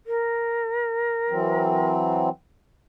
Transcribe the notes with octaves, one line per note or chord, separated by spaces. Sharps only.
A#4
E3 F#3 C4